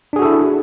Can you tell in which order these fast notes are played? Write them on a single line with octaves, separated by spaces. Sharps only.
D4 G#4 F#4 A4 E4